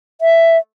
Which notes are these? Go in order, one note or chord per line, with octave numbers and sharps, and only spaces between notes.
E5